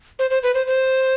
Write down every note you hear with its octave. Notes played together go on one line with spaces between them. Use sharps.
C5
C5
B4
C5
C5